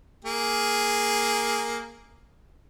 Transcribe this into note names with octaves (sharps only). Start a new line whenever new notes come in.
A#3 G#4